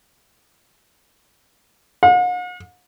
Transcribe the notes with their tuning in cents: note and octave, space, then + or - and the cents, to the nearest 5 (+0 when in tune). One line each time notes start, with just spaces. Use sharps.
F#5 -45